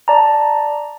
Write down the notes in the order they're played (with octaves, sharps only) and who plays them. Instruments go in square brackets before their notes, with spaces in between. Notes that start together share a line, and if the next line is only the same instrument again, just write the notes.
[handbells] D5 A5 A#5